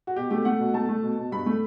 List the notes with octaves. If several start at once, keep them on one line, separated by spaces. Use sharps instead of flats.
F#4
B2 G4
A3 G4
A3 F#5
B2
A3 A5
A3
B2
B2
G2 B5
A3